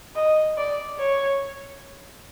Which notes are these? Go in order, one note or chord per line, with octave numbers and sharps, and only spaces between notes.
D#5
D5
C#5